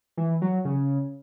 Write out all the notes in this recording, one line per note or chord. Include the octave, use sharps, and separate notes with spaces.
E3
F#3
C#3